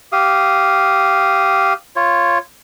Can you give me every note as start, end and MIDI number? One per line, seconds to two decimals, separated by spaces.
0.12 1.73 67
0.12 1.73 77
0.12 1.73 87
1.96 2.38 65
1.96 2.38 73